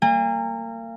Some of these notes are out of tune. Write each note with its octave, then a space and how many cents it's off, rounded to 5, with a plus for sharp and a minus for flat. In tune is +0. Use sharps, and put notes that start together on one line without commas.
A#3 -35 G#5 -45